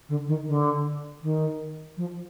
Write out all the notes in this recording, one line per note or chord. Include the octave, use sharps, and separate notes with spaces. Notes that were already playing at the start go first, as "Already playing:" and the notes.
D3
D#3
D3
D#3
F3